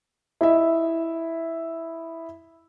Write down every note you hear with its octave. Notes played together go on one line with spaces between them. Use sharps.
E4 D#5 E5